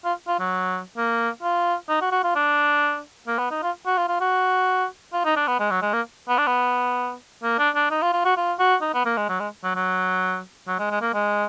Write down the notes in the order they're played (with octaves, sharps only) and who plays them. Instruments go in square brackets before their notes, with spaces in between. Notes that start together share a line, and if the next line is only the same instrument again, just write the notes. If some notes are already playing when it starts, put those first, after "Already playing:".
[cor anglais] F4
F4
F#3
A#3
F4
D#4
F#4
F#4
F4
D4
A#3
B3
D#4
F4
F#4
F4
F4
F#4
F4
D#4
D4
B3
G#3
F#3
G#3
A#3
B3
D4
B3
A#3
D4
D4
D#4
F4
F4
F#4
F4
F#4
D#4
B3
A#3
G#3
F#3
G#3
F#3
F#3
F#3
G#3
G#3
A#3
G#3